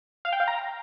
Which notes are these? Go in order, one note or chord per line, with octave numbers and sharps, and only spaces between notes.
F5
G5
F5
A#5